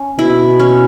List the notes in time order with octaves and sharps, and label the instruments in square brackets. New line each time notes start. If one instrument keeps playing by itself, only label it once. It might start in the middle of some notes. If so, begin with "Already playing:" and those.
Already playing: [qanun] C#4
[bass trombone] B2 [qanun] E4
[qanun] C#4